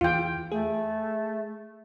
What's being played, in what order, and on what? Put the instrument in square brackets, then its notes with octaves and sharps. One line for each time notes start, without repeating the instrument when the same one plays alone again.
[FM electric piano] E2 E3 G#4 [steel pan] F4 G5
[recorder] A3 [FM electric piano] G#4